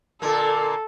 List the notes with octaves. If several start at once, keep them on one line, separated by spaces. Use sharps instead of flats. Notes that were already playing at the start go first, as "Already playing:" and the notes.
A#2 D3 A#3 A4